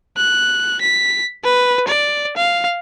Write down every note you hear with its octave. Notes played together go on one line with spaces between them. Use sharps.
F#6
B6
B4
D5
F5